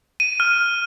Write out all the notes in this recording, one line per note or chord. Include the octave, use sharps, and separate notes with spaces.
D#7
F6